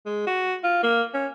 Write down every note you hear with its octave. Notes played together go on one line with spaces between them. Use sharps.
G#3
F#4
F4
A#3
C#4